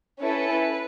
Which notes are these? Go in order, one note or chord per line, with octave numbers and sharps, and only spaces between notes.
C#4 E4 A4 B4